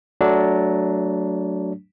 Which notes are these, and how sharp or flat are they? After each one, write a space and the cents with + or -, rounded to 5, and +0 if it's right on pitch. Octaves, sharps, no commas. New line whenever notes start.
F#3 +15 A3 +0 D4 -10